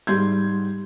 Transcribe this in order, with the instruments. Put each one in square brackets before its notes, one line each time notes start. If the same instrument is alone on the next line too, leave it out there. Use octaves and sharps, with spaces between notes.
[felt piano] G#2 G3 C6 G6 G#6